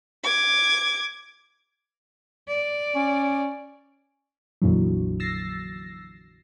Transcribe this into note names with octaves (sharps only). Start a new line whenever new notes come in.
D6 G#6
D5
C#4
A#1 F2 A#2 D3 E3 F#3
E6 A6 A#6 C7